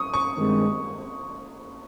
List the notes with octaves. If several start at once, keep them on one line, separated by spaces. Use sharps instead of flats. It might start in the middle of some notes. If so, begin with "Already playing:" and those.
Already playing: C#6 D#6
C#6
G2 D#3 G#3 C4